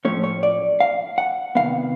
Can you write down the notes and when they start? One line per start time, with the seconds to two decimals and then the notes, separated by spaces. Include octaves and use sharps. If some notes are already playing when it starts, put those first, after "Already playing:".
0.05 A2 F3 A3 C#4 C#5
0.24 C#5
0.43 D5
0.80 F5
1.18 F#5
1.55 C3 D#3 G#3 B3 F5